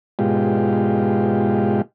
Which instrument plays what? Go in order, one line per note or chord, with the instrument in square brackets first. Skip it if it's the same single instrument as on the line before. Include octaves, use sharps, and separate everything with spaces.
[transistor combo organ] G#2 B2 G#3 F4 G4